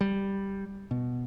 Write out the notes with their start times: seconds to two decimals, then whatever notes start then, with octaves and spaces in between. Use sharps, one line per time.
0.01 G3
0.91 B2